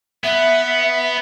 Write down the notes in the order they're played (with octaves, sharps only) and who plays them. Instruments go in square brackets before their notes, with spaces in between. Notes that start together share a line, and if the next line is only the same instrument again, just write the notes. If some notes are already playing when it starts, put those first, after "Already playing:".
[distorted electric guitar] B3 [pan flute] E5